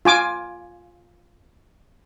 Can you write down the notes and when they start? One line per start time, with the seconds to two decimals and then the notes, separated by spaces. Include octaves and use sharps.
0.05 F4 G#5 D6